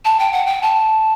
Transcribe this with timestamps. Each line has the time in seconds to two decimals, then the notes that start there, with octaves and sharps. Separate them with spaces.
0.05 A5
0.19 G5
0.33 F#5
0.46 G5
0.62 A5